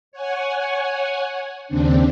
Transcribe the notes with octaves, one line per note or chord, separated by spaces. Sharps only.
C#5 F#5 G#5
D#2 C#3 C4 D4